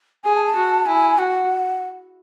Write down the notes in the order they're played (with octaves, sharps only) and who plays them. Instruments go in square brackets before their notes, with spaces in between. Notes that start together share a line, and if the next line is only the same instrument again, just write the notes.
[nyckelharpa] G#4 [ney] G#5
[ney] A5
A5
[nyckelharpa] F#4
[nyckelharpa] E4 [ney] G#5
[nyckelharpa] F#4 [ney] F#5